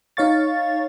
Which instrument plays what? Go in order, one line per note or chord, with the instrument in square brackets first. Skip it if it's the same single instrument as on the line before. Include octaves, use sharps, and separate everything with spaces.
[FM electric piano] D#4 C#5 F5 C#6 A6